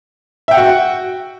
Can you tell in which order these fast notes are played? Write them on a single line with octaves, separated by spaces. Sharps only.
E5 G5 F#5 F#4